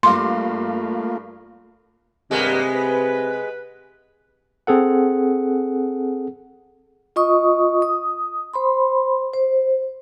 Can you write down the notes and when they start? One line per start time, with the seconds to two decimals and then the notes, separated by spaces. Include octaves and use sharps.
0.03 G2 A3 A#3 F4 F5 C6 D6
2.31 G2 C3 D#3 G#3 A#3 B3
2.72 B4
4.67 C4 G#4 A4 F#5
7.16 F4 D#5 C#6 D#6
7.82 D#6
8.54 C5 B5 C6
9.34 C5